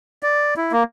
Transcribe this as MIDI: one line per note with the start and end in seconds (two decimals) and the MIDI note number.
0.23 0.54 74
0.57 0.72 64
0.72 0.83 58